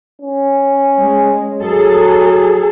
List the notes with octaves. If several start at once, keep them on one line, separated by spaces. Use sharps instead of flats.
C#4
G#3
F#3 G#4 A4